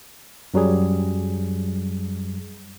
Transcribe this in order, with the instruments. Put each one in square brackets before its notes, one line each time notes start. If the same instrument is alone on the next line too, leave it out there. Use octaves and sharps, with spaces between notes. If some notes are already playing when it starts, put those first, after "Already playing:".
[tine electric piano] F#2 F#3 G3 G#4